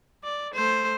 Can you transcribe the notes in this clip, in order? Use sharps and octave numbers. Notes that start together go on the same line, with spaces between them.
D5
A3 C5